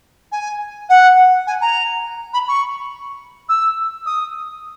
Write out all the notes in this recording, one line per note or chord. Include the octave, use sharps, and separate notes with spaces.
G#5
F#5
G#5
A#5
B5
C#6
E6
D#6